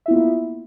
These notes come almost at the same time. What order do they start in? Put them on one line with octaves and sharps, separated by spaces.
E5 E4 B3 F4 A#3